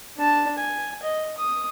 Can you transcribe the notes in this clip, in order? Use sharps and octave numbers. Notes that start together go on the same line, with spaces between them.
D4 A5
G#5
D#5
D#6